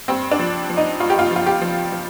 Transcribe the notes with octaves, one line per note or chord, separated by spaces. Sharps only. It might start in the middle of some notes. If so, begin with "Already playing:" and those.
G2 C4
D4
F3
F3
D#4
G2 F4
G4
F4
F3 F4
G4
F3
F3